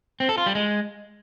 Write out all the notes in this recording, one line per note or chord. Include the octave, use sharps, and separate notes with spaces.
C4
A4
F4
G3
G#3